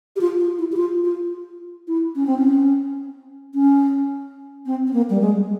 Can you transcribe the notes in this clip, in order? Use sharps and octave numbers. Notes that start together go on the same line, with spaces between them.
G4
F4
F4
E4
G4
F4
F4
E4
C#4
C4
C#4
C#4
C4
C4
A#3
G3
G#3